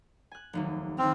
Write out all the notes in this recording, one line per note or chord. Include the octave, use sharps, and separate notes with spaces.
G#5 F#6
F1 D#2 F#3
D#2 C4 F6